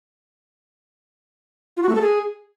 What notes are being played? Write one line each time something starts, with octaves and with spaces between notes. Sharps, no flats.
F4
F#4
A3
A4
G#4